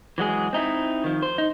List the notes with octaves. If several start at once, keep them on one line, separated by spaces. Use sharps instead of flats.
E3 F#3 G#3 G#4
C4 D#4 E4
D#3 F3
C5
D#4